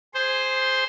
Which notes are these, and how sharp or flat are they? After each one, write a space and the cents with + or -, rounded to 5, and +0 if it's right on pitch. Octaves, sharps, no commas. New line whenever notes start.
G#4 +0 C5 +0